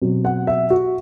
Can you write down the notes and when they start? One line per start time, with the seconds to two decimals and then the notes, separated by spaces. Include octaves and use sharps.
0.02 B2 F#3 C4
0.25 F#5
0.47 E5
0.70 F#4